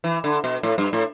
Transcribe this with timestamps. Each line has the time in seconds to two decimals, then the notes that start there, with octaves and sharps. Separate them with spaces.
0.04 E3
0.24 D3
0.44 B2
0.63 A2
0.78 G2
0.93 A2